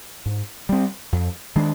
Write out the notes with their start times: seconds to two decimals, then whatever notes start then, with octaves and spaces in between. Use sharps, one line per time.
0.26 G#2
0.69 G3 C4
1.12 F2
1.55 D#3 G#3 D4